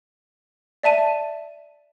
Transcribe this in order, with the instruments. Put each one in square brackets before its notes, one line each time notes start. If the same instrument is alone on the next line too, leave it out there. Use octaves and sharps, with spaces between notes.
[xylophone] D5 E5 A5 D#7